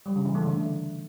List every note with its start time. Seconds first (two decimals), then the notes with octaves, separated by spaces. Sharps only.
0.06 G3
0.16 C#3
0.25 E3
0.35 A3
0.45 D3